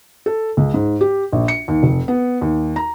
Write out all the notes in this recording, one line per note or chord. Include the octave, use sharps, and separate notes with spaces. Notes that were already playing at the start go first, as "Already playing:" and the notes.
A4
C#2
G#2
G4
A#1
C#7
D#2
F1
B3
D#2
A#5